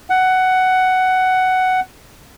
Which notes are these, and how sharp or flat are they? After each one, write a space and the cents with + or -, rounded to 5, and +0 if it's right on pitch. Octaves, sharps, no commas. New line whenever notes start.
F#5 +10